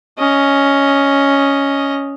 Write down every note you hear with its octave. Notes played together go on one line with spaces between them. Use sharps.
C#4 D#5